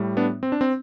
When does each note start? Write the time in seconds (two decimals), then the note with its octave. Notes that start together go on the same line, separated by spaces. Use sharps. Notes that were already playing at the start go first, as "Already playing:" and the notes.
Already playing: A2 G3
0.17 B3 D4
0.43 C4
0.52 D4
0.61 C4